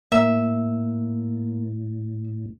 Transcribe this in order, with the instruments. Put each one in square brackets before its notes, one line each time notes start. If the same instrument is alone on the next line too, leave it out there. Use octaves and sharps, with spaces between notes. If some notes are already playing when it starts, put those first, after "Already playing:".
[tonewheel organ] A2 [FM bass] A#3 [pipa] E5